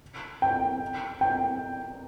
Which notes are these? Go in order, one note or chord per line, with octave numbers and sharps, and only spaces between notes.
G5
G5